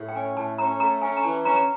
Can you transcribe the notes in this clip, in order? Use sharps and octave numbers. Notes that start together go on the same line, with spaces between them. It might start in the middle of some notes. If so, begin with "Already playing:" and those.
Already playing: A2
G5
C#4 G#5
A2 A5
C#4 A#5
A3 A#5
C#4 G#5
A#5
E3 A5
C#4 A#5
A#5